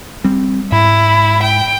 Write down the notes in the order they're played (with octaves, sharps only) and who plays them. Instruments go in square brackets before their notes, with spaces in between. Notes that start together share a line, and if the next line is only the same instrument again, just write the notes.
[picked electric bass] G3 C4
[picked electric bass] G#2 [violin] E4
[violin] G5